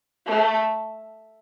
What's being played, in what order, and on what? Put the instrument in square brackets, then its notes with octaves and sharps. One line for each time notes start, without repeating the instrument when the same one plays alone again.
[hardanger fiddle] A3